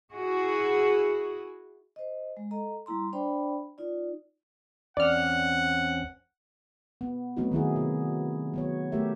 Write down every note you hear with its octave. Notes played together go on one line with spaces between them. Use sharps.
E4 F#4 G#4
C5 D#5
G#3
A4 D#5 A#5
G3 A#3 E4 A#5 C6
D4 C5 D5 G5 B5
D#4 F4 D5
E2 C4 C#4 D5 F#5 F6
B3
F#3 A3 B3 C4 D#4 F#4
D#3 A#3 E4 G#4
C3 B3
F#3 B3 C#5
A3 A#3 G4 A#4 E5